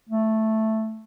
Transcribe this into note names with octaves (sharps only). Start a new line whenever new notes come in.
A3